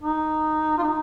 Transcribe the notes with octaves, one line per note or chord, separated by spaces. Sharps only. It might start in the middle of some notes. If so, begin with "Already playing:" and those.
D#4
F4
D#4